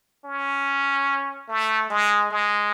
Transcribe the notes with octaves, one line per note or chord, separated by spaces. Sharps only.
C#4
A3
G#3
G#3